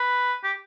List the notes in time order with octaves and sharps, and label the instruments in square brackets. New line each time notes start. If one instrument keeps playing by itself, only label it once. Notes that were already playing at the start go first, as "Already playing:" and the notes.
Already playing: [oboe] B4
G4